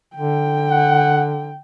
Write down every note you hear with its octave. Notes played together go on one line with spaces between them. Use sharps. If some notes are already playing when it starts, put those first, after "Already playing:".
D3 G5
F#5